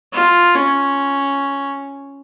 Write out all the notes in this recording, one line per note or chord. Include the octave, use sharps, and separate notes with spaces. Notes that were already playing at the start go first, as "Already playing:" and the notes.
F4
C#4